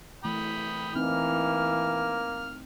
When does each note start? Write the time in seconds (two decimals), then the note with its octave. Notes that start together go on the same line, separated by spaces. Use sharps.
0.24 E3 A3 G5 B5 D#6
0.96 E3 A#3 C4 D#4 F6